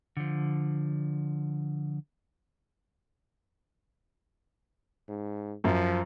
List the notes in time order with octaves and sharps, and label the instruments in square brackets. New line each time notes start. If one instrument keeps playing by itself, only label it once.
[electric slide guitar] D3 F3
[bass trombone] G#2
[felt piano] F#2 [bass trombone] F3